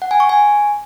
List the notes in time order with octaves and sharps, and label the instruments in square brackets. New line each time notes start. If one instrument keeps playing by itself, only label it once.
[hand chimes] F#5
G#5
C#6
G#5